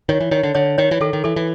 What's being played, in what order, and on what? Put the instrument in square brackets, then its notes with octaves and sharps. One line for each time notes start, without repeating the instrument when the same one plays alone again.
[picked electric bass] D#3 [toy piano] C#5
[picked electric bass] E3
[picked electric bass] D#3 [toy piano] C#5
[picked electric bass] D3
[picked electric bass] D3 [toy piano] C#5
[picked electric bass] D#3 [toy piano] C#5
[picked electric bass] E3
[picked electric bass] D#3 [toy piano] A4
[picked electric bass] D#3
[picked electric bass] E3 [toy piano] A4
[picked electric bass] E3